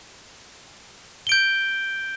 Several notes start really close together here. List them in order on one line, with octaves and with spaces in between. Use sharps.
G7 D7 G6